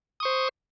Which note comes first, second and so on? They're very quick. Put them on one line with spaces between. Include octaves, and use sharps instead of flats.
D#6 C#6 C5